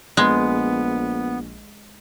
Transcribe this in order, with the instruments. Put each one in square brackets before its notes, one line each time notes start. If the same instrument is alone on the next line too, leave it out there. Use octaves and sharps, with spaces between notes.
[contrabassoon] A#1 [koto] G#3 [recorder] B3